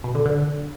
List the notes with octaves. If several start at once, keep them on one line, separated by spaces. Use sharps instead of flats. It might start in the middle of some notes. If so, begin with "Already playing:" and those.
B2
D3
D3